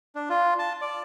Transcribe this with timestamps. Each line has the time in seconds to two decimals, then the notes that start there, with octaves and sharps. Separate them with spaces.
0.15 D4
0.29 F4
0.59 A5
0.81 D5